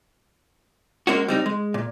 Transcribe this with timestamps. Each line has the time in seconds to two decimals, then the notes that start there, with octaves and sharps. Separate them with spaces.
1.07 G#3 A#3 C#4 F#4
1.28 G3 C4 D#4
1.46 G#3
1.74 A#2